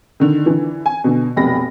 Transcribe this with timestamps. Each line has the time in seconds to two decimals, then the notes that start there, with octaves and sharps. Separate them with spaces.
0.20 D3 D#3
0.46 D3 E3
0.86 G#5
1.04 B2 D3
1.37 F1 B1 B5 A#6